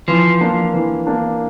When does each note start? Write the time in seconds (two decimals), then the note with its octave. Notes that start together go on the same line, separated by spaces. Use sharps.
0.08 E3 F3
0.41 A#3 D4
0.74 E3
1.07 A#3 D4